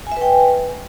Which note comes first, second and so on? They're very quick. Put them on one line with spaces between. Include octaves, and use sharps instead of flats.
G#5 E5 B4 G5